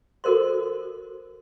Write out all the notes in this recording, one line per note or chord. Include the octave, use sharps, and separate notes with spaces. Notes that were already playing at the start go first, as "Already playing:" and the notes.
F#4 A4 A#4 C5 C6